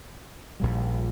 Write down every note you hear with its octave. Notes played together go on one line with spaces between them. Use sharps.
A#1 A#2 G3